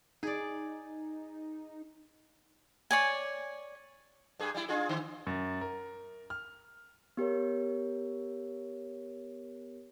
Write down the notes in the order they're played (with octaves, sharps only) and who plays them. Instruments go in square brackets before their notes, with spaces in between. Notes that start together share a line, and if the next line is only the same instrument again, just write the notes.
[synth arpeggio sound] D#4 [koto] G#4 D5
[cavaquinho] C#5 D5 G#5
[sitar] G2 G#4
G3 E4
D4 F4 G#4
D3
[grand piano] F#2
A#4
F6
[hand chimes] B3 G4 A#4 C#5